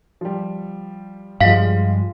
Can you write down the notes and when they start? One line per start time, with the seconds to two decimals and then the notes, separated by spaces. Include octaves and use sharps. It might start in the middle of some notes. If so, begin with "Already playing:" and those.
0.21 F3 G3
1.41 G2 F3 G3 G#3 F5 B6